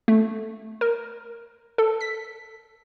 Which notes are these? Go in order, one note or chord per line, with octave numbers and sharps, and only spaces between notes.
A3
A#4
A4
B6